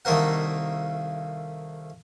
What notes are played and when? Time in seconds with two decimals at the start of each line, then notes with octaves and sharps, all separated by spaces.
0.05 C2 D#3 A3 A#3 A#4 F#5